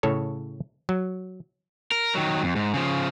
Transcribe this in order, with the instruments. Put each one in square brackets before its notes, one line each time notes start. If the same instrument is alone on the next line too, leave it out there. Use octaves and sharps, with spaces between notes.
[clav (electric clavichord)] A2 C#3 A4 C#5
F#3
[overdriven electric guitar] A#4
D#3 F#3
F2
G#2
C#3 F3